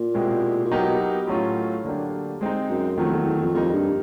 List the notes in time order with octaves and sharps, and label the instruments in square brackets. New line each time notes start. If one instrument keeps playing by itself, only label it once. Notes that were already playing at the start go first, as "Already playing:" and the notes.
Already playing: [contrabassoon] A#2
[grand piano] B2 G#3 C4 E4 G4
[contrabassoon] A#2
[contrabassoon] B2 [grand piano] F#3 B3 D#4 G4 A#4
[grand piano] A2 F#3 A3 C#4 F4
D3 F#3 A#3 D4 G4
G#3 C4 D#4
[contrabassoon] F#2
[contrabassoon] F2 [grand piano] D#3 F#3 A3
[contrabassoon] E2
E2
F2
[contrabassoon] F2 [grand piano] G3 A#3 D#4
[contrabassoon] G2